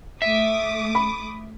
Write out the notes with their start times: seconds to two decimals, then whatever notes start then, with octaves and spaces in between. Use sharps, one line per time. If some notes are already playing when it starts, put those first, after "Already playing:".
0.22 A3 E5 D6 D#6
0.95 B5